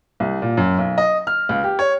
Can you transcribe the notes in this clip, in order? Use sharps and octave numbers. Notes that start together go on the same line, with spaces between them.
C2
A#2
F#2
B1
D#5
F6
C#2
G4
C#5